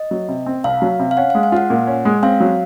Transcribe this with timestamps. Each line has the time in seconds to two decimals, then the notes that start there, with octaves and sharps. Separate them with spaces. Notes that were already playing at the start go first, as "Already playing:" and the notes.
Already playing: D#5
0.11 F#3
0.28 C3
0.46 C4
0.64 C2 F5
0.82 F#3
0.99 C3
1.11 F5
1.17 C#4 F#5
1.30 F5
1.35 G#3
1.43 F5
1.52 F4 F#5
1.70 A#2
1.87 C#4
2.05 G#3
2.23 C4 F5
2.40 F#3